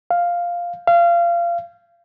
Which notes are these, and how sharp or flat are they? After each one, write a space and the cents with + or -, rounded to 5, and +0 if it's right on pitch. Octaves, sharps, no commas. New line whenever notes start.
F5 +0
F5 -25